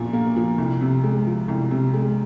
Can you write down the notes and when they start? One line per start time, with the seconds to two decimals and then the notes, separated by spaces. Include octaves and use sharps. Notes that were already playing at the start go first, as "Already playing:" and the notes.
Already playing: A#1 A#2 F3
0.13 A#3
0.36 F3
0.58 C2
0.81 C3
1.04 G#3
1.27 F3
1.48 C2
1.71 C3
1.94 G#3